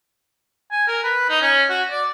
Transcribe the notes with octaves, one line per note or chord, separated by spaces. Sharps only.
G#5
A#4
B4
D#4
C#4
F#4
D5